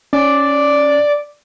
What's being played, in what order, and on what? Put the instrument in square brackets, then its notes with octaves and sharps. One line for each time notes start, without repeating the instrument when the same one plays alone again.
[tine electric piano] C#4 [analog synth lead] D5